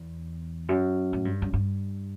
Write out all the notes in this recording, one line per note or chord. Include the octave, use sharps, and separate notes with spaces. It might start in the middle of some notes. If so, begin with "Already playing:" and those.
Already playing: E2
F#2
A2
G2
F#2
G2